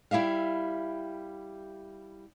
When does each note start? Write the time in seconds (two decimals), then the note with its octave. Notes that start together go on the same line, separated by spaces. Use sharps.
0.11 G3 E4 G4 E5 F5